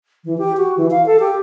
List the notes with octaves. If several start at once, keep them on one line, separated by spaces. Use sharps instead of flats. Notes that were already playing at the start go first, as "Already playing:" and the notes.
E3
G4
F#4
E3
F5
A4
G4